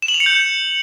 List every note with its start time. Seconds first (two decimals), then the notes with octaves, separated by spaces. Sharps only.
0.02 E7
0.08 F#7
0.14 F7
0.20 C#7
0.26 G6